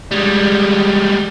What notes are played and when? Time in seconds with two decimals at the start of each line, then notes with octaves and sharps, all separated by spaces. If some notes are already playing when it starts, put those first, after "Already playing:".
0.11 G3 G#3